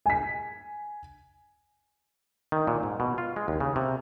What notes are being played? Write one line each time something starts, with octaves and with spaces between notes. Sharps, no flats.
G#5 B6
D#3
A#2
G#2
B2
F4
G#3
D#2
C#3
C3